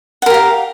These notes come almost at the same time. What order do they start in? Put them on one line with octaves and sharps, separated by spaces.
F#5 A#4 G4 F5